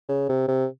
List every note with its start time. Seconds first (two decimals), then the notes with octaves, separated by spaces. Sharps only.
0.08 C#3
0.29 C3
0.48 C3